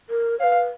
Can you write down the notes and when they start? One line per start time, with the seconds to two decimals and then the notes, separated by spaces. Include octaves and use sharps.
0.10 A#4
0.39 B4 C#5 F5